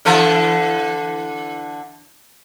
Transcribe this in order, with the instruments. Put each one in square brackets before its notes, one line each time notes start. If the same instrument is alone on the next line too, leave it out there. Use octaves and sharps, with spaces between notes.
[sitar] D3 E3 A4